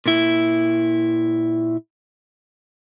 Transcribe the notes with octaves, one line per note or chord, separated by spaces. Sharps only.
A#2 E4